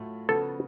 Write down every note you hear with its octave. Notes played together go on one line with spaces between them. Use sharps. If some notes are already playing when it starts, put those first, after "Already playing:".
Already playing: A2 F#3 A3 F4
C#3 F3 B3 F#4 A4